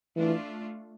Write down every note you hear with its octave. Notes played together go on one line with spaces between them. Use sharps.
E3 A3 D4 F4